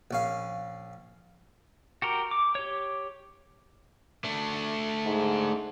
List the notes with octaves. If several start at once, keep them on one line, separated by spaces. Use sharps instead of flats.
A#1 C#4 F5
F#4 G4 A#4
D6
G4 C#5
A3 D4
G#2